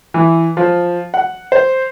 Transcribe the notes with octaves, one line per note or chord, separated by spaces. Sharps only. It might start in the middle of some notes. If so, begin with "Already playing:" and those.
E3
F3
F#5
C5